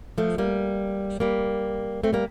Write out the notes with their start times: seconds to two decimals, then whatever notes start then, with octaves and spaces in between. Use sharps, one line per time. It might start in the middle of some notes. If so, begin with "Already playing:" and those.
0.18 F3 A3
0.38 G3 A#3
1.20 G3 A#3
2.03 A3 C4
2.13 G3 A#3